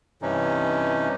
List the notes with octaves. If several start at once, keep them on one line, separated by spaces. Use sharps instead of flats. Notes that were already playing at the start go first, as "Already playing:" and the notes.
G2 C3 E3 C#4 D#4